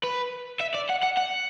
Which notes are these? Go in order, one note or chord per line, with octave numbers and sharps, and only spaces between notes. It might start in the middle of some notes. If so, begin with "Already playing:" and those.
B4
E5
D5
F#5
F#5
F#5